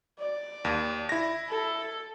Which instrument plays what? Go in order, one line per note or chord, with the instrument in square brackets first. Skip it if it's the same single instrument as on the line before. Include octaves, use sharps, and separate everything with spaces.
[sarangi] D5
[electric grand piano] D#2
E4 A#6
[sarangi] A4